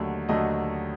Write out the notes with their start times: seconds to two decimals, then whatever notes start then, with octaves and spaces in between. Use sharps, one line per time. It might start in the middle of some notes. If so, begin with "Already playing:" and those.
Already playing: D#2 D3 F#3 A3
0.29 D#2 D3 F#3 A3 D#5